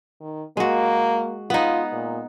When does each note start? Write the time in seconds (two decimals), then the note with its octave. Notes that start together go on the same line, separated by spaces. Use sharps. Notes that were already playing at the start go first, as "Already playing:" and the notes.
0.20 D#3
0.57 G#3 A#3 F#4
1.50 B3 D#4 F4
1.92 A#2